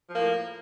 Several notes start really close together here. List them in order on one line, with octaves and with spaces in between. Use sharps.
F3 A#3 A2